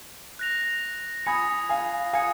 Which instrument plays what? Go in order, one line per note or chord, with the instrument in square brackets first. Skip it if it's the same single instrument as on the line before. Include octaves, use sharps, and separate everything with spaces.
[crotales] F#6 A#6 F7
[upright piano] G#5 B5 [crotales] D#6 G#6 C#7
[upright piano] F5 G#5
[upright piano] F5 G#5 [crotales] D#6 G#6 C#7